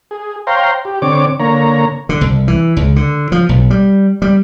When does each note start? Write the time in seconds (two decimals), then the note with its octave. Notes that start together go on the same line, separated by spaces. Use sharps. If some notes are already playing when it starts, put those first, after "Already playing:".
0.11 G#4
0.47 C5 C#5 F5 G5 A#5 C6
0.85 G4
1.02 D3 C4 C#5 D6
1.40 D3 A#3 C#5 A#5
2.09 D3
2.21 C2
2.48 E3
2.77 C#2
2.96 D3
3.32 F3
3.49 B1
3.70 G3
4.22 G3